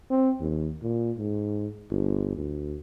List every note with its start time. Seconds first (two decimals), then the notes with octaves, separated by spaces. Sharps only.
0.11 C4
0.40 D#2
0.82 A#2
1.18 G#2
1.90 G1
2.36 D2